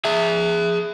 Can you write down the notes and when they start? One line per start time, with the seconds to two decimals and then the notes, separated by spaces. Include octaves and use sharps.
0.05 G#4 E5